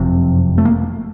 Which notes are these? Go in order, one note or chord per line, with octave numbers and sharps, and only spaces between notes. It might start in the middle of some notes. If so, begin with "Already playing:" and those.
Already playing: F#1 F2 C3
A3
A#3